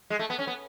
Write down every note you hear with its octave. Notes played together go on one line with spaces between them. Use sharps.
G#3
A3
B3
C#4
B3